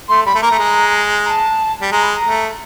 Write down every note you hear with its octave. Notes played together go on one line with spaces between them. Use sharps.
A3 C6
G3 B5
A3
A#3 A#5
A3
G#3
A#5
A5
G3
G#3 A#5
B5
A#5
A3